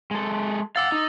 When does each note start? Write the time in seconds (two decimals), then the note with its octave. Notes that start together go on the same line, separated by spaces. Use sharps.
0.11 G#3 A4
0.76 F5 F#5 D6 E6 A6
0.92 D#4